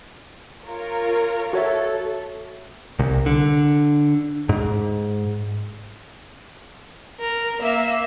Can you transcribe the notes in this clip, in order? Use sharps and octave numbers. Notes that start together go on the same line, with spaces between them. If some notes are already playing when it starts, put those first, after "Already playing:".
F4 A#4 C#5
F#4 A4 C#5 E5
C2
D3
G#2
A#4
A#3 E5